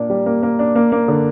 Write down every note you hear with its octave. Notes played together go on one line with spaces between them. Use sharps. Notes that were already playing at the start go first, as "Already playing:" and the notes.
Already playing: A#2 A#3 D4
G3
A#3
A#3
D4
A#3
A#3
D3